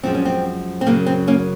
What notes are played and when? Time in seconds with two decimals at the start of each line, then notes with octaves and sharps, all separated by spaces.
0.03 F#2 F3 G#3 C4
0.15 C#4
0.25 C4
0.81 C4
0.86 F#2 C#3 F#3 A#3
1.07 C4
1.27 A#3 C#4